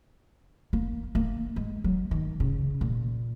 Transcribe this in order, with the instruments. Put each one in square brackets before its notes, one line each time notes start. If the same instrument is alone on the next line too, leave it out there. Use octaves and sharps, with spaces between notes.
[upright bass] A#3
A#3
G#3
F#3
D#3
C#3
A#2